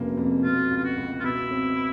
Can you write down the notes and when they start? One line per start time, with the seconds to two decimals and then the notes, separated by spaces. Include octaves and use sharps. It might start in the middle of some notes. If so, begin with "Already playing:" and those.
Already playing: F1 C#3 F#3 A#3
0.17 F2
0.44 B2 F4
0.71 C#2
0.77 F4
0.84 F#4
0.97 C#2
1.20 F4
1.24 B2 E4
1.51 C4